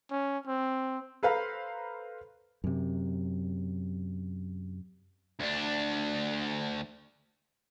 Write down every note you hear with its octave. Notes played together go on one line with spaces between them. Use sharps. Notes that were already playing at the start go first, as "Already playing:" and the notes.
C#4
C4
A4 B4 C5 F5 A#5 B5
F#2 C3
D2 D4